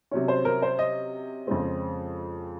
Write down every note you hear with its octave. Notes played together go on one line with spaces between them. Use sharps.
C3 F#3 C#4
C5
A#4
C5
D#5
F2 C#3 G#3 C4